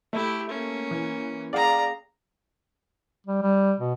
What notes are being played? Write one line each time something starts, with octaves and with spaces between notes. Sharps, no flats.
A3 E4 G4
A#3 C#4
E3
G#4 D5 F5 G5 A#5
G3
G3
B2